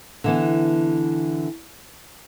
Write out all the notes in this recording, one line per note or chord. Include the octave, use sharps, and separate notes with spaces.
D3 E3 B3